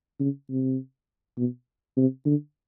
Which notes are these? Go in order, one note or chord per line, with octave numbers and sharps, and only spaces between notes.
C#3
C3
B2
C3
D3